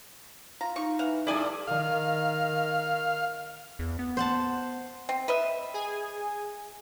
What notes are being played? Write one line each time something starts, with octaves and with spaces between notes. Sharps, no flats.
F4 A#5
D#4 C#6
E3 F5 F#5
G2 A3 E4 G#4 D5 G#5
D#3 F5
E2
B3
C5 F#5 A5
C4
B4 D#5 E5
G#4 G#5